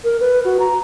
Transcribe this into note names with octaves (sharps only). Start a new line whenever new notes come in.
A#4
B4
F#4
A#5